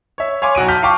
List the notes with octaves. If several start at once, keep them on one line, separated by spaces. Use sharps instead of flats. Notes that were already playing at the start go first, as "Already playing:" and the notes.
C#5 E5
C#5 F5 G#5 C6 D6
B1 F#4 D7 D#7
A5 F6 G6 B6
F5 G5 A5 C#6 D6